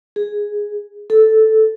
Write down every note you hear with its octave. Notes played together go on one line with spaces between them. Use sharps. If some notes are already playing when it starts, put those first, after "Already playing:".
G#4
A4